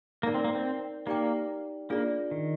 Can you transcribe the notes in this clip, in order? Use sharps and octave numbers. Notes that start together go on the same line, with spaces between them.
A#3 D#4 A#4 D5
C4
A#3
C4
A#3 D#4 G4 D5 G5 D6
A#3 D4 F4 G#4 D5
D#3